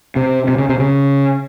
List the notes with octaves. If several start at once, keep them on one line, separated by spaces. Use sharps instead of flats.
C3
C3
C#3
C3
C#3